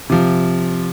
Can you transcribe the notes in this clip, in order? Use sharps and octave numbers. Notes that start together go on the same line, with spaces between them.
C3 F3